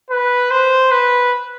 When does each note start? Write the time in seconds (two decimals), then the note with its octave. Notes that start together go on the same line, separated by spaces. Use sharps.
0.11 B4
0.51 C5
0.92 B4